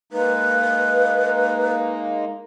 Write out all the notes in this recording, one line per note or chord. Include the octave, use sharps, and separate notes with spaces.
G#3 A#3 D#4 B4